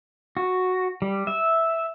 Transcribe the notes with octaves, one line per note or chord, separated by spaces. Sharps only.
F#4
G3
E5